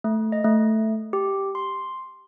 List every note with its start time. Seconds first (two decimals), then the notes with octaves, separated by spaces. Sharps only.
0.04 A3
0.32 D#5
0.44 A3
1.13 G4
1.55 C6